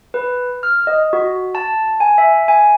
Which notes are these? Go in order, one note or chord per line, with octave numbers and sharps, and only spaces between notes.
B4
F6
D#5
F#4
A5
G#5
E5
G#5